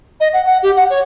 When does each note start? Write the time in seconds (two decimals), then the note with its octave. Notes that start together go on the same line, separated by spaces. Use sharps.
0.20 D#5
0.33 F#5
0.46 F#5
0.63 G4
0.76 F#5
0.90 C#5